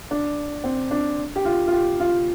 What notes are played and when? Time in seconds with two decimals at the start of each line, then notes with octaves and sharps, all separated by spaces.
0.11 D4
0.64 C4
0.91 D4
1.36 G4
1.45 F4
1.67 F4
1.72 G4
2.00 F4